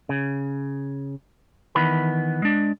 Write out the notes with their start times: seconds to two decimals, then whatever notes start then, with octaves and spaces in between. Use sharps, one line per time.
0.09 C#3
1.75 D#3 E3 B3 B5
2.42 G#3 D4